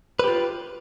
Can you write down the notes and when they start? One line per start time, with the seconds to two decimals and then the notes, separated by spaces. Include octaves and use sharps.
0.19 B4
0.24 G4
0.28 F4